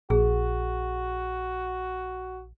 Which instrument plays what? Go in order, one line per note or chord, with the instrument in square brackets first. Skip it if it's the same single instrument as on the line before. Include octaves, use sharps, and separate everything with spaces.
[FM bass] A#1 [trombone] F#4 [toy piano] G#4